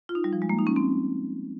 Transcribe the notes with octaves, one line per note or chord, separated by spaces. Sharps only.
F4
D#4
G3
F3
G#3
A#3
D#4
C#4
C4